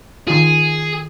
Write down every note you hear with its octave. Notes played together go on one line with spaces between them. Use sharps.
D#3 F4 G#4